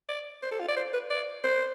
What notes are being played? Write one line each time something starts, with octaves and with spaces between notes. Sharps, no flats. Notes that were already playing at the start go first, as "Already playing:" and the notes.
D5
C5
A4
F4
D5
C5
B4
D5
C5